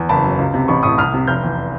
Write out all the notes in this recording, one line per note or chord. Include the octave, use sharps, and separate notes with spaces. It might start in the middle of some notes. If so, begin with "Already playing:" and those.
Already playing: E2
F#1 A5 B5
F#2
C#2
C3
A1 B5 C#6
A2 C#6 D#6
C2 D#6 F6
C3
F1 F6 G6
E2